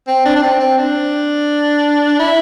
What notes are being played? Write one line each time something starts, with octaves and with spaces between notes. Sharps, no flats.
C4
D4
D4
C4
C4
D4
E4